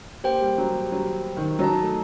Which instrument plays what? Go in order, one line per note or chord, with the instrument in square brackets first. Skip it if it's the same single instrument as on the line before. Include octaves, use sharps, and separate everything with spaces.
[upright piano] A#3 [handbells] G4 C5 G5
[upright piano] G3
F#3
F#3
D#3
[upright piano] F#3 [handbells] D#4 A4 D#5 A5
[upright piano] A3